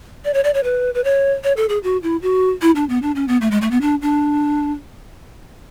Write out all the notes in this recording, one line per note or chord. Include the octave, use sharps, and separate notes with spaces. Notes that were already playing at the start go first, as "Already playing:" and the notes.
D5
C#5
D5
C#5
B4
B4
C#5
C#5
A4
G#4
F#4
E4
F#4
E4
D4
B3
D4
C#4
B3
A3
G#3
A3
B3
D4
D4